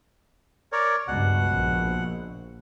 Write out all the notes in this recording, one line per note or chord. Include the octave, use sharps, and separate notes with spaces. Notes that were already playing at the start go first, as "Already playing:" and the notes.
A#4 C#5 D5
C#2 G2 B2 F#5
A#1